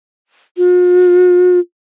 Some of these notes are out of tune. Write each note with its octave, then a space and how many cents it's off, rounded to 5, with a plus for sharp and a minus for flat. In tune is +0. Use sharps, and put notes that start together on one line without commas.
F4 +45